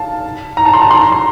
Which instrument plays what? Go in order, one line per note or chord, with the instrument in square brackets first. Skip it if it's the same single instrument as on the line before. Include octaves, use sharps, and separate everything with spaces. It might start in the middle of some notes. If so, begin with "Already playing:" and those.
Already playing: [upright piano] F5 A5
A#5
A5
C6
A5
C6
A#5
C6